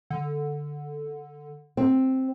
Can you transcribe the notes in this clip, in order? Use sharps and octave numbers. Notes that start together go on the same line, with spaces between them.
D3
C4